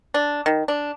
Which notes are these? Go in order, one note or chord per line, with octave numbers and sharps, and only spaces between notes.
D4
D#3
D4